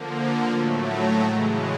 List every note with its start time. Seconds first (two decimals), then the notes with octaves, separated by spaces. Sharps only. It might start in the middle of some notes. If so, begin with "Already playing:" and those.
Already playing: D3 F3 A#3
0.50 A2 F#3 A3
0.87 A#5
1.24 C#3 E3 G#3